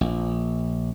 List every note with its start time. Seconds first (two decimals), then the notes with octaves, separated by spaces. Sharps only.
0.01 A#1